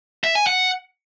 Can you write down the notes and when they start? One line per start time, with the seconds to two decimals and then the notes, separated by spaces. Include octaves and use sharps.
0.24 E5
0.35 G#5
0.47 F#5